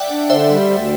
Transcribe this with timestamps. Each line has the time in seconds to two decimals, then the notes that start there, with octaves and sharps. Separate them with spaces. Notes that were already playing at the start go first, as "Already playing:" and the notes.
Already playing: D5 E5 F#5 G5
0.10 D4
0.30 D3 C5 E5
0.50 G3
0.70 D2